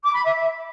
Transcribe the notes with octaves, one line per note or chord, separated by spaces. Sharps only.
D6
B5
E5